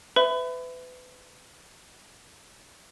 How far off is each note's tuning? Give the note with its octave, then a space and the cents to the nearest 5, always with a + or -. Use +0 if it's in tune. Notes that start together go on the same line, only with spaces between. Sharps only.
B4 +30 E5 +0 B5 +30